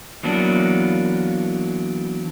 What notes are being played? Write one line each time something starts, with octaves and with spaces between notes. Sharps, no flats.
E3 F#3 A#3 B3 D4